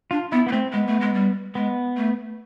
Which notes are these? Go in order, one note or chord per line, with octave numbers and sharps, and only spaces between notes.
D4 F4
B3 E4
A#3 B3
A3 C4
G#3 B3
A3
G#3
G3
G#3 B3
A3